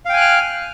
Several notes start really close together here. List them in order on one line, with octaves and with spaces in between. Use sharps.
F5 G5 G#5 F#6 F6